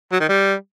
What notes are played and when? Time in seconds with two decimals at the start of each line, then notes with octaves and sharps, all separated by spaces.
0.12 F#3
0.20 D#3
0.29 G3